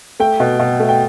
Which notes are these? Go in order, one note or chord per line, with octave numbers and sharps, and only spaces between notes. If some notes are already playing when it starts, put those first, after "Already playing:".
A3 G5
B2
B2
A3
G5